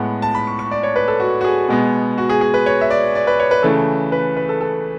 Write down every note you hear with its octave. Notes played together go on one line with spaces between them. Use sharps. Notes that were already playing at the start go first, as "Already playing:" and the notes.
Already playing: A2 G#3 B3 F#5
A5
B5
C#6
C#6
D5
C#5
B4
A4
F#4
F#4
G#4
B2 G#3 B3
F#4
G#4
G#4
B4
C#5
E5
D5
D5
B4
C#5
B4
C#3 E3 A3 A4
B4
B4
A4
A4